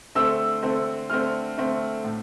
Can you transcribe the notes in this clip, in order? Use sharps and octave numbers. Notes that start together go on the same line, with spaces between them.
D3 A3 C4 E6
D3 A3 C4
D3 A3 C4 F6
D3 A3 C4
A2